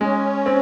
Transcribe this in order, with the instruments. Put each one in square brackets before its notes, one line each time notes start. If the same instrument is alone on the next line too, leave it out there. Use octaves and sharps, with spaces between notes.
[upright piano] G#3 [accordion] C#4
[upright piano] C4